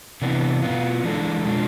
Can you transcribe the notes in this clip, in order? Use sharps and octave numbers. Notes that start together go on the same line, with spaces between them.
C3 E3 B3 D4
B2 B3 F4
E3 G#3 D4 A4
B2 G#3 D4 F4